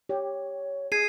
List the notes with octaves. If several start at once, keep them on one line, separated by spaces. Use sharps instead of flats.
G4 C#5
G#4 G#6 C7 D#7